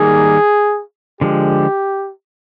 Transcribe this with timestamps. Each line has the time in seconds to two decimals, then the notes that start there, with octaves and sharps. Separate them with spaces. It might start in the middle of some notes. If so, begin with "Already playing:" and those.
Already playing: D#3 G3 A#3 D#4 G#4
1.21 D3 F3 G#3 G4